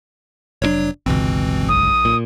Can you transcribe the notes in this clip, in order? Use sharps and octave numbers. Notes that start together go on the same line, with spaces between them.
F1 G#2 F#3 D4 C#5
G1 C#2 B2 E3 C4
B1 D#6
A#2